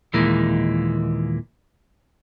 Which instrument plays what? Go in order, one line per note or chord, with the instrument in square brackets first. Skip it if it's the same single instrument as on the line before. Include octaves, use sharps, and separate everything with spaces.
[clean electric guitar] D#2 A#2 E3 G#3 A#3